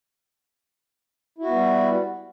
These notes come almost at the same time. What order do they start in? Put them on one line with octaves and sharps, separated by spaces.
E4 F#4 B3 G3